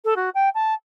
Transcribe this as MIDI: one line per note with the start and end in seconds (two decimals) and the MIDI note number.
0.04 0.14 69
0.16 0.29 66
0.34 0.49 79
0.54 0.74 81